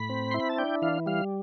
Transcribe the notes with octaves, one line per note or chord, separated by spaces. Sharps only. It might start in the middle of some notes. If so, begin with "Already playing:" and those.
Already playing: A2 B5
C4
E4 C6
B5
A5
D4 G5
E3 F5
G3 F5